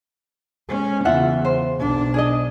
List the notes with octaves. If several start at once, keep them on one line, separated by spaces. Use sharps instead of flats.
G#3 C#4
E2 C#3 F4 E5 F#5
C5
B1 D4
G#4 D5 D#5